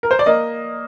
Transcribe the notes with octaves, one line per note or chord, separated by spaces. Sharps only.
A#4
C5
D5
A#3 D#5